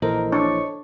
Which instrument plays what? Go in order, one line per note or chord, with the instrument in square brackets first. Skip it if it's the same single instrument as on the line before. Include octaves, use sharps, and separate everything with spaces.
[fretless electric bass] A#1 A#2 E3 [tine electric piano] A4 C5 D#5 [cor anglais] A#4
[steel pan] D4 [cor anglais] C#5